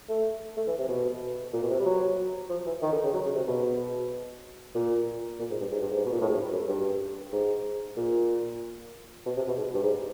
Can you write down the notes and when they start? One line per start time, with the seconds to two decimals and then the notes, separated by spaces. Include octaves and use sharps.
0.09 A3
0.57 A3
0.67 E3
0.78 C3
0.89 B2
1.53 A#2
1.63 B2
1.70 C3
1.80 G3
1.86 F#3
2.50 F3
2.66 E3
2.82 D#3
2.92 D3
3.04 C#3
3.14 F#3
3.25 C#3
3.35 C3
3.47 B2
4.75 A#2
5.39 A#2
5.51 G#2
5.61 G2
5.72 G#2
5.82 G2
5.90 G#2
6.05 B2
6.13 A#2
6.21 A2
6.29 G#2
6.36 G2
6.53 F#2
6.68 G2
7.33 G#2
7.97 A#2
9.26 B2
9.37 C3
9.47 B2
9.58 G#2
9.74 G2
9.83 G#2